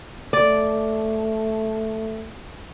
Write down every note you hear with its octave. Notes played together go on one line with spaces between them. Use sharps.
A3 D5